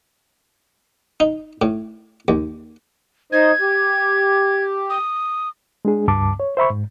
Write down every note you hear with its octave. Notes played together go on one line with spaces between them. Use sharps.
D#4
A2
D#2
D#4 C5 D#5 G#6
G4
D#6
G#3 D4 G#4
C#2 G2 A5 D6
C#5
C5 E5 B5 C#6
G#2